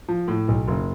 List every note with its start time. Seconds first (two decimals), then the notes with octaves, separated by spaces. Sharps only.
0.09 F3
0.28 A2
0.48 B1
0.68 F#1